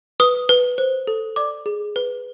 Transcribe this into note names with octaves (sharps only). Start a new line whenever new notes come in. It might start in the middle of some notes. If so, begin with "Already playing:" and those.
B4 D#6
B4
C5
A4
D5 D6
G#4
B4